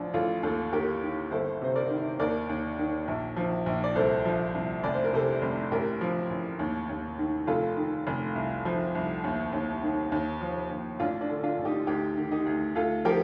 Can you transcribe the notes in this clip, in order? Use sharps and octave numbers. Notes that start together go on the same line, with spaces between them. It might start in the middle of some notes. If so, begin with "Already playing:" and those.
Already playing: A1 F3 D4
A1 F4 A4
D#2 F4 A4
D#2 G4 A#4
D#3
G1 A4 C5
C3 C5
A#4 D5
D#3
D#2 A#4 D5
D#2
D#3
A#1
F3
A#1
D5
C2 A4 C5
F3
C2
F1 D5
C5
A#4
C3 A4 C5
F1
A1 G4 A#4
F3
A1
D#2
D#2
D#3
F1 F4 A4
D#3
F1
C2
F3
C2
D#2
D#2
D#3
D#2
F3
D#2
A1 D4 F4
D4
D3
D4 F4
A1
D#4 G4
D2 D#4 G4
D#3
D#4 G4
D2
D2 F4 A4
F3 G4 A#4